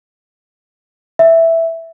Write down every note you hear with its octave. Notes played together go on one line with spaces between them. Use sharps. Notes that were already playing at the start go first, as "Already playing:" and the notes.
E5